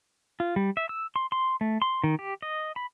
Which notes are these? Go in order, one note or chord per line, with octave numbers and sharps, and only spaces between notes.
F4
G3
E5
E6
C6
C6
A3
C6
D#3
G4
D#5
B5